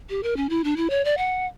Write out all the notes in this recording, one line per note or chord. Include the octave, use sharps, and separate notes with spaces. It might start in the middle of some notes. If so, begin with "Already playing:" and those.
G4
A#4
C#4
E4
D4
E4
C#5
D5
F#5